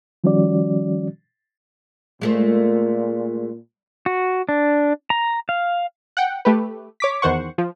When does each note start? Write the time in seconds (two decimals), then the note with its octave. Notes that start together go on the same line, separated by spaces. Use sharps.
0.24 D#3 F3 G3 C#4 F#4 D5
2.21 A#2 G#3 A3 C5
4.06 F#4
4.49 D4
5.10 A#5
5.49 F5
6.17 F#5 G5
6.45 A3 G4 B4
7.00 C#5 D6 B6
7.22 E2 D#3 C5 F#5 C#6
7.58 F3